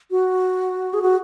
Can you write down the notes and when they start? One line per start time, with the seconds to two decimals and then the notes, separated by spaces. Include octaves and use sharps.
0.11 F#4
0.94 G#4
1.02 F#4